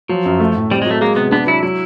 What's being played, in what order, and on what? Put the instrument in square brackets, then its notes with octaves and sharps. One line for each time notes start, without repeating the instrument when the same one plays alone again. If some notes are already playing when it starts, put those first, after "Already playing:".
[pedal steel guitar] F3 [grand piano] F#3
[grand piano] F#2
A3
A2
[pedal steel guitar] G3 [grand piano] C4
[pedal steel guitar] G#3
[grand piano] F#3
[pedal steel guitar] A3
[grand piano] G#3 [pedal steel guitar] A#3
[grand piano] C3 [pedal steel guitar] B3
[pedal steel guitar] B3 [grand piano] D4
[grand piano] F#3 [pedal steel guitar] E4
[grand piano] F#3 [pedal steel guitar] E4